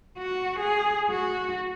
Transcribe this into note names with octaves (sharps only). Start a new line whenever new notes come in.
F#4
G#4
F#4